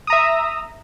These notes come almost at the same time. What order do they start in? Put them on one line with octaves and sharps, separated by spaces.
D#6 A#5 E5